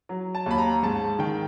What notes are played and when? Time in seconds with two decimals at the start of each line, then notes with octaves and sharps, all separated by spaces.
0.09 F#3
0.35 A5
0.46 D#2 B5
0.58 A#5
0.83 G#2 A5
1.19 D#3 G5